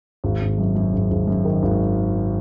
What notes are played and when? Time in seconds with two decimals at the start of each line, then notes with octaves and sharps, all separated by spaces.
0.24 G#1
0.41 G#1
0.58 F#2
0.76 F#2
0.93 G#1
1.11 G#1
1.28 F#2
1.45 D#3
1.63 G#1